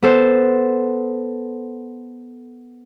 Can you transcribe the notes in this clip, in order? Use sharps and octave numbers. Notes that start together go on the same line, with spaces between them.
B3 A4 C5